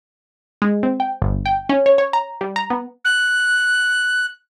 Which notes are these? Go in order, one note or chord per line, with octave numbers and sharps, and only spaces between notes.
G#3
C4
G5
G1
G5
C#4
C#5
C#5
A#5
G3
A#5
B3
F#6